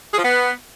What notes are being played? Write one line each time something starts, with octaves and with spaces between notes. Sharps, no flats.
G#4
F3
B3